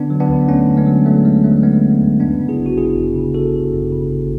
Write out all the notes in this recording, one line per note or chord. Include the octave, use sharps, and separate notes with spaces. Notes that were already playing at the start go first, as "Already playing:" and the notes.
Already playing: D3 B3 D4
F#3
B3 D4
D2
D2 A3 C#4
D3
G#3 B3
F#3
D2 F#3 A3
D2 G#3
D3 F#3 A3
F#3 G#3 B3
D2
D2
F#2 B3 D4
C#3
E4 G#4
G#1
F#4
G#1 E4 G#4
F#2
C#3
G#1 F#4 A4
G#1
F#2
C#3
G#1